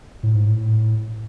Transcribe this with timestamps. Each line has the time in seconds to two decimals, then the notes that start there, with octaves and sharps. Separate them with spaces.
0.23 A2
0.35 G#2
0.47 A2